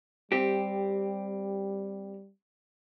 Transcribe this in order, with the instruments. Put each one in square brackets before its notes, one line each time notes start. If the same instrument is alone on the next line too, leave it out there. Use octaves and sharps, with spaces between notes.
[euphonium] G3 [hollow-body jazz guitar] C4 G4